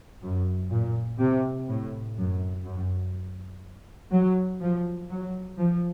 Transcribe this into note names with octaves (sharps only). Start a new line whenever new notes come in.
F#2
A#2
C3
A2
F#2
F#2
F#3
F3
F#3
F3